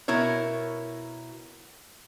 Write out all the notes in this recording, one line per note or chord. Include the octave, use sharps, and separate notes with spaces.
B2 E4 A#4 C#5